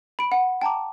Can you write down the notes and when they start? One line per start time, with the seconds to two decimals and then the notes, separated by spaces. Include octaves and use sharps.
0.19 B5 D7
0.32 F#5
0.62 G5 A5 A#5 D6